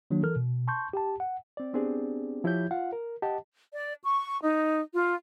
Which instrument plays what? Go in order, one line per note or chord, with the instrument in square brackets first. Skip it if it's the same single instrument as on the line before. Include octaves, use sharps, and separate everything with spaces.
[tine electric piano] D#3 F#3 A#3 D4
E3 A4 A#4 F6
B2
A5 C6 C#6 G6
G4 G5 A5
F#5
[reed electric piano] C4 D5
B3 C4 D4 G4 G#4 D5
F3 E4 G4 C#5 E5 G6
F4 F5 F#5
A#4
G4 D#5 F#5 A5
[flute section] D5
C#6
D#4
F4